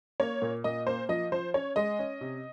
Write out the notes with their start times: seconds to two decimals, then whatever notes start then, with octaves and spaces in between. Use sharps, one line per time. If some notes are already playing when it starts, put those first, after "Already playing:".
0.20 A#3 C#5
0.42 A#2
0.64 A#2 D#5
0.87 A#3 C5
1.09 F3 D#5
1.32 F3 C5
1.54 C#4 C#5
1.76 G#3 D#5
1.99 C#4
2.21 C3